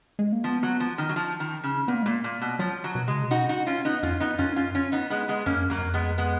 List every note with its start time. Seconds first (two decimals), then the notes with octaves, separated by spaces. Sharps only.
0.19 G#3
0.32 A#3
0.44 F3 B3
0.63 F#3
0.80 F3
0.98 D#3
1.09 F#3
1.16 F3
1.40 D#3
1.64 C#3
1.88 A#2 B3
1.95 A#3
2.02 G#3
2.06 A#2 A#3
2.24 A#2
2.41 B2
2.59 F3 F#3
2.84 F#3
2.95 B2
3.08 C#3 G#3
3.22 B2
3.31 D#4 F#4
3.49 D#4 F#4
3.67 C#4 F4
3.85 B3 D#4
4.03 F2 C#4 F4
4.20 B3 D#4
4.39 F#2 C#4 F4
4.56 C#4 F4
4.75 C#4 F4
4.92 B3 D#4
5.10 G#3 B3
5.28 G#3 B3
5.46 F#2 A#3 C#4
5.55 F2
5.65 F#2
5.70 F#3 A#3
5.78 F#2
5.83 F2
5.94 G#3 B3
6.18 G#3 B3